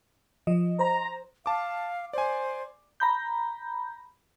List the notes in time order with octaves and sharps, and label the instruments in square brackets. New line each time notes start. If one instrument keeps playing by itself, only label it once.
[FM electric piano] F3 D#5
[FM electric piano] C5 [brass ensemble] A#5
[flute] F5 [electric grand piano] A5 D6
[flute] C5 [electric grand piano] D5 G#5
[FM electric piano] A#5 B5 G6